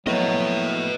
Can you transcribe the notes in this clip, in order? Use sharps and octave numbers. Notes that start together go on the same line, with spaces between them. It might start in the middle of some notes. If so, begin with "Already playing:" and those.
A2 F3 F#3 A#3 B3 B4 D#5